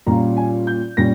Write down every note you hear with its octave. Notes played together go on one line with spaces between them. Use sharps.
A#2 G3 C#4 F4 A#5
G#5
G6
A#2 G3 C#4 A#6